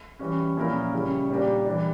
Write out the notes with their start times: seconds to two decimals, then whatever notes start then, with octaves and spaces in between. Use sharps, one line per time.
0.19 E3 G3 C#4
0.57 A#2 F3 C#4 E4 A#4
0.93 C#3 G3 C#4 E4
1.29 A#2 G3 A#3 D4 G4
1.66 E3 G3 D4